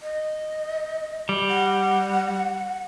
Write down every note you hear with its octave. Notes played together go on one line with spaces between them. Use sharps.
D#5
G3
F#5